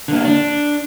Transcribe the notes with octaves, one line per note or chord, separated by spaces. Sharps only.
D3 A#3
D4